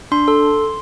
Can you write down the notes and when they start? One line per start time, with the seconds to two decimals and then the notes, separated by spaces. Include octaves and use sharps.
0.12 D4 C6
0.28 A4